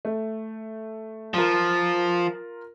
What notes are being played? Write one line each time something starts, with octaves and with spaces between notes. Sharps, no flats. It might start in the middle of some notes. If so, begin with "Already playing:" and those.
A3
F3 F4 A#4